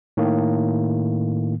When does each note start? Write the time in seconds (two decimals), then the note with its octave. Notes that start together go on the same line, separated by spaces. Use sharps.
0.17 A2 D#3 A#3